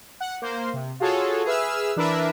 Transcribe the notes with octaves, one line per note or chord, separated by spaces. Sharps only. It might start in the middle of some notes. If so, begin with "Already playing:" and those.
F#5
A#3 C5
C3
F4 F#4 G#4 A4 C#5
G#4 B4 E5 E6 F6
E3 D4 E4 A#4 B4 E5